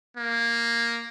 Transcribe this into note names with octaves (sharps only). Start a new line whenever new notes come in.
A#3